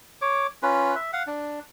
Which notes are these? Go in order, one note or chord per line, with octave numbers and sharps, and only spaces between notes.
C#5 D6
C#4 F4 B4
E5
F5 F#5
D4